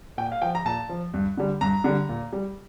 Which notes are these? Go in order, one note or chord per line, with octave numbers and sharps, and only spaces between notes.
A#2 G5
F5
F3 G5
A#5
A#2 A5
F3
G2
D3 G3
G2 A#5
D3 G3
A#2
G3